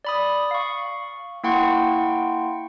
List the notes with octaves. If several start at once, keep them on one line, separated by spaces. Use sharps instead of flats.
D5 B5 D#6
F5 C#6
A#3 E4 F#5 G5 C6 C#6